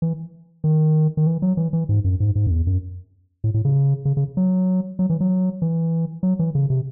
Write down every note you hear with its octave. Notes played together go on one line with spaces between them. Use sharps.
E3
D#3
D#3
E3
F#3
E3
E3
G#2
F#2
G#2
G#2
F#2
E2
F#2
A2
A2
C#3
C#3
C#3
F#3
F#3
E3
F#3
E3
F#3
E3
C#3
C3